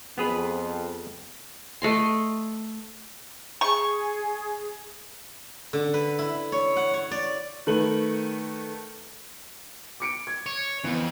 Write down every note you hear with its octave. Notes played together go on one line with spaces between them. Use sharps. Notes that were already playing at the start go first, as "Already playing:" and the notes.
F2 B3 G#4 B4
A3 D#5 C6
G#4 C#6
D3
B4
E4
C#5
F#5
C#5
D5
D#3 A3 B4 F#7
D6 C#7 D7
G#6
C#5
F2 E3 B3